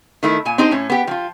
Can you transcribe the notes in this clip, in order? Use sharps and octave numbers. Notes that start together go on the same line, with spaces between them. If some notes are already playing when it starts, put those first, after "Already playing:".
D#3 A3 E4
A#2 G#5
C4 D4 D#4 G4 C5
A2 C#4
B3 G4
F3 F4